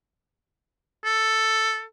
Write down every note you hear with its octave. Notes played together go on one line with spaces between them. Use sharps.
A4